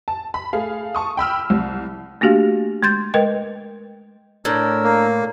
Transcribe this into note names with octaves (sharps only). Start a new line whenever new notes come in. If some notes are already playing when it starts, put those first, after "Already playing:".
A5
B5
A3 G#4 F5
A5 C#6 D#6
G5 B5 E6 F6
C2
A3 A#3 D4 F#4 G4 F5
G#3 C6 G6 A6
G#3 A#4 B4 D#5 G5
A2 D4 A#4 E6
A#3